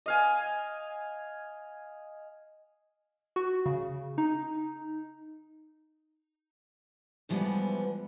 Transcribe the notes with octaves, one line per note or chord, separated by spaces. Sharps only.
D#5 F5 G#5
F#4
C#3
D#4
C3 E3 F3 G3 G#3 B3